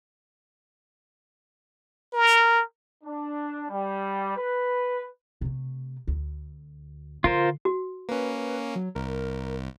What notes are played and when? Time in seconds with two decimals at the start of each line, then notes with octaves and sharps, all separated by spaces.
2.13 A#4
3.04 D4
3.70 G3
4.36 B4
5.41 C3 A3
6.07 D2
7.24 D3 F4 A#4 C5
7.65 F#4
8.09 A#3 C#4 B4
8.75 F#3
8.95 C2 A#4